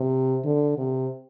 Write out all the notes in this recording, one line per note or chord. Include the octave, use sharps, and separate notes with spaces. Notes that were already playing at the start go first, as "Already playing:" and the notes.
Already playing: C3
D3
C3